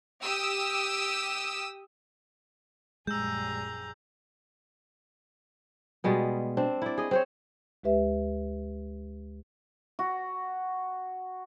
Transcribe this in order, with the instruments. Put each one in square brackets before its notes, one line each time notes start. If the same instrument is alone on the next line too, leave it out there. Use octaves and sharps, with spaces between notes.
[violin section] G4 D#6 E6
[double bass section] A#1 F#2 G3 [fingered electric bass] G#3 [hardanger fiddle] G#4 A#5 [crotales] E6 G6
[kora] B2 G3 G#3 B3
C4 D4
E4 D5
G#4 D#5
C4 C5 C#5
[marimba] D2 G#3 G4 B4 E5
[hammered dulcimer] F#4